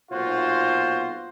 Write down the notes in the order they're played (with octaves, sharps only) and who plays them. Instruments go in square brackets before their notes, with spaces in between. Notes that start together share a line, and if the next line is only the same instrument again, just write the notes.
[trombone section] B1 A#2 F4 F#4 C5